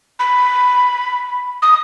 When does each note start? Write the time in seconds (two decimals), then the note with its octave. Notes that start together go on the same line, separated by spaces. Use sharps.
0.19 B5
1.62 D#6